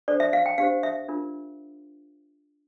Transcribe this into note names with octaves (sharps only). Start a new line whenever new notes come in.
D4 A4 C5 D5
E5
F5
G5
D4 G4 C5 F5
E5
D4 F4 A#4